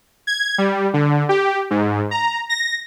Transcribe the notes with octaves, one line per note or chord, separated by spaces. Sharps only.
G#6
G3
D3
G4
G#2
A#5
A#6